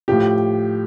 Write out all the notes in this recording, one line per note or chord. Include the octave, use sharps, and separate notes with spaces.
A2 F3 G4